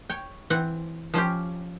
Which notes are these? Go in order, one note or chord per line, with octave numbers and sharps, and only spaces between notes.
C#5 G5
E3 C4 F#5
F3 C#4 F4 G4